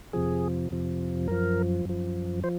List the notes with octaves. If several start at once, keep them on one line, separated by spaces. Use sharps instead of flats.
F2 C3 F3 G#4
F2 C3 F3
F#2 F3 A#4
F#2 F3
F3 C5